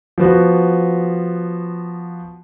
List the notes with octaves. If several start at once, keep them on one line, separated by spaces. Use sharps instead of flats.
F3 B3 F#4